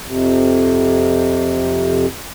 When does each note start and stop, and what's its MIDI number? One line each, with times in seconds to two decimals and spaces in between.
0.06 2.06 41
0.06 2.06 48